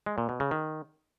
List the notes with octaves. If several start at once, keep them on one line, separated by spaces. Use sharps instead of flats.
G#3
A#2
B2
C#3
D#3